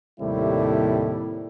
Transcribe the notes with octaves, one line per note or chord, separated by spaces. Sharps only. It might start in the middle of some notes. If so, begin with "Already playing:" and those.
D#2 A2 C3 G3 A3 E4